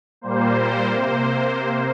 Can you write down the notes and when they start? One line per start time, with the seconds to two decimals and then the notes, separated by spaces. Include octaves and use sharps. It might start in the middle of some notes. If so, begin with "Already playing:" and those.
0.21 A#2 G3 A#3 C5
0.92 C3 A#3 C5